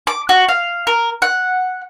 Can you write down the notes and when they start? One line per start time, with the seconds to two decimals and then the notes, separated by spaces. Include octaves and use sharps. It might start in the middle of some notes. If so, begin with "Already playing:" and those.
0.07 D6
0.29 F#4
0.48 F5
0.87 A#4
1.22 F#5